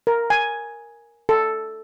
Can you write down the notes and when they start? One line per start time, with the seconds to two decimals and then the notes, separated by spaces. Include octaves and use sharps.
0.07 A#4
0.30 G#5
1.29 A4